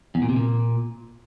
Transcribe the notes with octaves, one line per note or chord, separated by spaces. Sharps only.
E2
A#2
C3
A#2